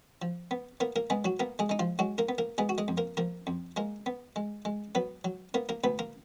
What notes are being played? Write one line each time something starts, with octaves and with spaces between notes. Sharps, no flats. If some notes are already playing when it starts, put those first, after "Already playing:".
F3
B3
A#3 B3 A#4
A#3 A#4
G#3 B3 G#4
F#3 F#4
A#3 B3 A#4
G#3 G#4
G#3 D#4
F3 F4
F#3 G#3 F#4
A#3 A#4
B3
A#3 A#4
G#3 B3 G#4
F#4
G#3 G#4
F2
A#3 A#4
F3 A#3 A#4
F2
G#3 A#3 A#4
B3
G#3
G#3
F#3 B3 B4
F#3
A#3 B3 A#4
A#3 A#4
D2 B3 B4
A#3 A#4